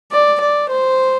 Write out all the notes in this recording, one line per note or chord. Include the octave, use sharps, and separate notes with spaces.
D5
D5
C5